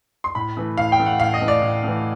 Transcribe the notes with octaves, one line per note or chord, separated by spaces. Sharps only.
C6
A2 B5
E3 A3
A2 F5
G5
E3 A3
F#5
A2 F5
D#5
E3 A3
D5
A2
E3 A3